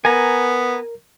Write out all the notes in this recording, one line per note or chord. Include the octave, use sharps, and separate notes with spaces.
B3 A#4 G#5 A#5